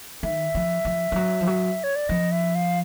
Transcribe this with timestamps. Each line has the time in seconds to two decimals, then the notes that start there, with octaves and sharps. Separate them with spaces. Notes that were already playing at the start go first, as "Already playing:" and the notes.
0.23 D#3 E5
0.55 F3
0.85 F3
1.12 F3
1.16 F#3
1.41 F3
1.47 F#3
1.84 C#5
1.96 D5
2.09 F3 D#5
2.32 E5
2.55 F5